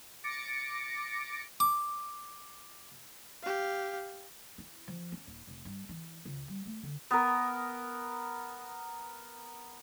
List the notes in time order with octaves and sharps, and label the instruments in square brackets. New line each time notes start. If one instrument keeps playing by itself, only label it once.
[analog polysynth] D6 A6 A#6 C#7 D7
[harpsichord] D6
[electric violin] G4 F5
[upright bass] E4
F3
C#4
D#1
F1
G2
E3
C#2
G3
A3
D3
[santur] B3 A#4